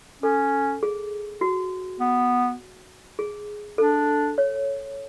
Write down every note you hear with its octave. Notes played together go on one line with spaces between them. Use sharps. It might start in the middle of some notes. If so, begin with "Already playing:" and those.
C#4 A4
G#4
F#4
B3
G#4
D4 A4
C#5